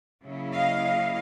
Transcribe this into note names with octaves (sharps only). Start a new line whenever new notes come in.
C#3 F#3 A#3 C#4 E4
D#5 F5